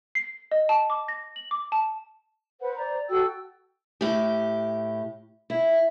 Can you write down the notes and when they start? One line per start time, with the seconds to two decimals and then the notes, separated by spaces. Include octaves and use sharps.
0.15 C7
0.51 D#5
0.69 A5
0.90 D6
1.08 A#6
1.36 F#7
1.51 D6
1.72 A5
2.61 B4 C5 F#5
2.76 D5 A#5
3.10 F#4 A4 G5 E6
4.01 A2 G4
5.50 E4